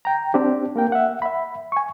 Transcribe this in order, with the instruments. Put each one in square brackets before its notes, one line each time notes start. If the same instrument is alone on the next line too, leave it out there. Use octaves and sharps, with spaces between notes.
[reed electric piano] G5 A#5
C4 D4 G4
A#3 A#4 G5
E5 F#5
E5 B5
G#5 C#6